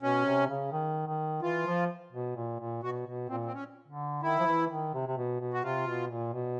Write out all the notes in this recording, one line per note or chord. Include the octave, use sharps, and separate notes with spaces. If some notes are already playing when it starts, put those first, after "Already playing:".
B2 C#4
C3
C#3
D#3
D#3
E3 F4
F3
B2
A#2
A#2
B2 F#4
B2
A#2 C4
C4
C#4
D3
D#3 E4
F3
E3
D#3
C3
C3
B2
B2
F#4
C3 F4
B2
A#2
B2